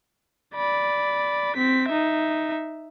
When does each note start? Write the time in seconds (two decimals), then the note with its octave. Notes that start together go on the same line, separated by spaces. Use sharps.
0.55 D5 B5
1.56 C4 B6
1.88 D#4 E5